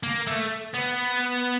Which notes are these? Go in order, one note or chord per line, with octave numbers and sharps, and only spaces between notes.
A#3
A3
B3